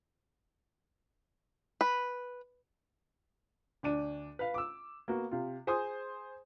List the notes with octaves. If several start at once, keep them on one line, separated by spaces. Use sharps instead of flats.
B4
D2 D4 D#7
B4 F5
D6 E6
A#3 B3 F#4
C3 F4
G#4 C5 G#5 C6 D#6